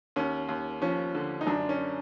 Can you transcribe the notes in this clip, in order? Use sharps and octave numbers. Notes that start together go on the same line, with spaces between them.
D#2 C#4
D#2
F3 C#4
D3
D#4
F#2 D4
C#4